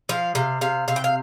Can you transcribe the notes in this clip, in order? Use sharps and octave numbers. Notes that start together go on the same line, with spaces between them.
F3 F5
C3 F5
C3 F5
C3 F5
G5
F5